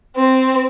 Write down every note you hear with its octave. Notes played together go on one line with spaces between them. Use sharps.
C4